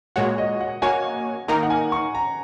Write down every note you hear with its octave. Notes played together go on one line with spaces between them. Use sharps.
A#2 G#3 F#4 C#5 F#5
D#5
F#5
A#3 F#4 C#5 G#5
D#3 A#3 D#4 A#4 A#5
F#5
G#5
C#6
A#5